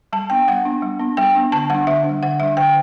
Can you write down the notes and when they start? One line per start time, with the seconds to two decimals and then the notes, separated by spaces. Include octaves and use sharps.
0.13 G3 A5
0.30 B3 D4 G5
0.48 G3 F#5
0.65 B3 D4
0.82 G3
0.99 B3 D4
1.17 G3 G5
1.35 B3 D4
1.52 D3 A5
1.70 G3 D4 F#5
1.87 D3 E5
2.04 D4
2.09 G3
2.23 D3 F#5
2.40 G3 D4 E5
2.57 D3 G5